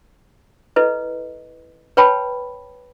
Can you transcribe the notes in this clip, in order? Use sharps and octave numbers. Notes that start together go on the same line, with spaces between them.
E4 A4 B4 D#5
B4 C#5 G5 A5 B5